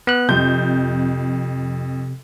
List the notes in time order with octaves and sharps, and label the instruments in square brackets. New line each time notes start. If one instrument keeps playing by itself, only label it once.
[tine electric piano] B3 F#6
[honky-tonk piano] F2 G6 [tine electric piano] C3